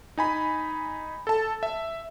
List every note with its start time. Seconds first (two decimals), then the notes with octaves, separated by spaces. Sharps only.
0.17 D#4 G#5 B5
1.27 A4 A5
1.63 E5